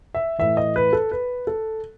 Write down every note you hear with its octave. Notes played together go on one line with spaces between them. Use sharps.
E5
A2 E3 E5
D#5
B4
A4
B4
A4